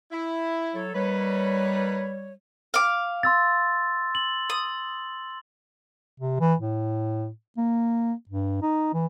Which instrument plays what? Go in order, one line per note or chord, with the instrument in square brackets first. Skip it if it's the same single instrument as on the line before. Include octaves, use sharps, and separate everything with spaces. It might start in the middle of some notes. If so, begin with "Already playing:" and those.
[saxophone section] E4
[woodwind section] F#3 A4 C#5
[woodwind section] G3 C#5 [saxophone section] A#3 D#4 B4
[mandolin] F5 D6
[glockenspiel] C6 E6 A6
F#7
[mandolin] D#6
[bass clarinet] C3
E3
A2
A#3
G2
D#4
E3